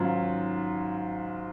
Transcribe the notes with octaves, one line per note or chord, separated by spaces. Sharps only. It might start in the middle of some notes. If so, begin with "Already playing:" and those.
Already playing: G#2 D#3 F#3 C#4 F4